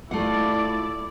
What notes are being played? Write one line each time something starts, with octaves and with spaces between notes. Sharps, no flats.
A3 E4 F4 D5 F#5